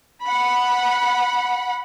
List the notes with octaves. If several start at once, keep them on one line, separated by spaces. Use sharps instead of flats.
F#5 B5